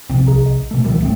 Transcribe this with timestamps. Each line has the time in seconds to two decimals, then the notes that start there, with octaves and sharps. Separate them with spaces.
0.10 A#1 C3 C4
0.27 C2 G#4 A#5
0.46 D#5
0.71 B2 A3
0.85 D2 B2 D#3 E3 G3
1.00 D1 G#1 A3 C4